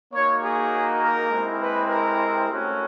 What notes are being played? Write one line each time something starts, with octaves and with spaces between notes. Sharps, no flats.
A#3 D#4 F#4 C#5
G#4
A#4
G#3 C4 E4 G4
B4
A#4
A3 C#4 F#4